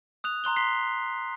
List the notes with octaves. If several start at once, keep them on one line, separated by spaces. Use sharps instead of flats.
D#6 F#6 F7
A#5 C6 F#6 G7
C6 B6 C7